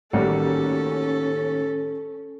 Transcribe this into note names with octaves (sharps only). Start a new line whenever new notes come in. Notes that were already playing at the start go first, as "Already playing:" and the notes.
A1 D#3 G3 A#3 C#4 F#4 A4